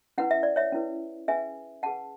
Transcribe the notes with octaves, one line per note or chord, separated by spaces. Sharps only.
C#4 E4 B4 F#5
E5
D5
C#5 E5
C#4 E4 B4
C#4 G#4 B4 E5 G#5
C#4 G#4 B4 F#5 A5